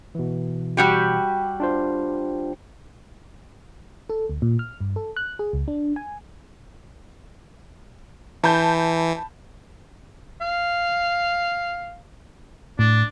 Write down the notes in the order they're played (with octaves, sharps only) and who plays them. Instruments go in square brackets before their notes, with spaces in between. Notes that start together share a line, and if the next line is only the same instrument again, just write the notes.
[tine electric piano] B2 E3
[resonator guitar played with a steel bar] G3 F#4 G4
[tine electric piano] D4 F4 C5
[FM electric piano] A4
D2
A#2
F6
G2
A4
F#6
G#4
C#2
D4
G#5
[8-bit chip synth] E3 [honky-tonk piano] A5 B5 G6
[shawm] F5
[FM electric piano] A2 [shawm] D4